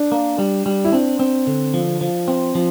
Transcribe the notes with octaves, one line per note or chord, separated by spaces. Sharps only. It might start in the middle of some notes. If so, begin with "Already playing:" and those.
Already playing: D4
A#3
G3
G3
E4
C4 D4
C4
D3
F3
F3
C4
F3